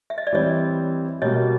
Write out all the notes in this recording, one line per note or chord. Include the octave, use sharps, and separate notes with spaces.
E5
D#5
D5
E3 G3 C4 C#5 D#5
B2 G3 A#3 C#5 D#5